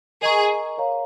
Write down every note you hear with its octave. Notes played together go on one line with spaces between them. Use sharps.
G#4 A#4 D#5 A#5 C#6
A#4 C#5 F5 A#5